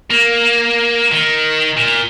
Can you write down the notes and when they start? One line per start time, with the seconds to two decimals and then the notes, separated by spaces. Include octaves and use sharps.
0.10 A#3
1.12 D#3
1.77 A#2